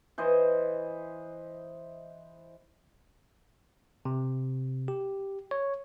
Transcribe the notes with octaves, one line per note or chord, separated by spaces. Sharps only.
E3 C5 D#5
C3
G4
C#5